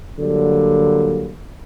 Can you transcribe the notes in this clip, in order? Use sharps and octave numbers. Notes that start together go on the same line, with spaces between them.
D3 F#3 G3 A#3